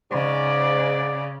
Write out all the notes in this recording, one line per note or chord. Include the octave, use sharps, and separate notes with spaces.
G#2 C#3 D5